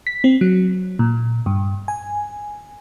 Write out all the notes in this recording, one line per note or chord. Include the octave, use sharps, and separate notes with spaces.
B6
C4
F#3
A#2
G2
G#5